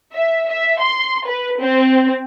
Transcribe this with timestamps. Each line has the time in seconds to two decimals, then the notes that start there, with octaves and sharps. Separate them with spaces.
0.13 E5
0.49 E5
0.82 C6
1.27 B4
1.60 C4